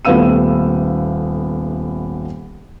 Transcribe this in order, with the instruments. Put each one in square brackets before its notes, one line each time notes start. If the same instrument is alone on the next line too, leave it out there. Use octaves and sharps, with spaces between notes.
[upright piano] D#1 A3 B3 F5 E6 D#7